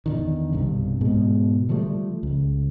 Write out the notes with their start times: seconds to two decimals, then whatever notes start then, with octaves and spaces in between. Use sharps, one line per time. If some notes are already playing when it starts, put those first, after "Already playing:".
0.06 E2 D3 D#3
0.52 B1 G2 C3
1.01 G#2 B2 G#3
1.69 D3 F3 G3 A3
2.23 C#2